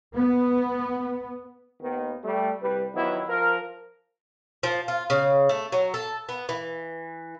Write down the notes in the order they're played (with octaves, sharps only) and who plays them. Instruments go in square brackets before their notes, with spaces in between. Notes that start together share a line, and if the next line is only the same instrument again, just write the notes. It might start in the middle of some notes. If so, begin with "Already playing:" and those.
[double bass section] B3
[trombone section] D#2 D#3 B3
G3 A3
C2 G3 B4
D#3 F3 F#3 B3 E4
F3 A#4
[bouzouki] F3
F4
C#3
A3
F#3
A4
B3
E3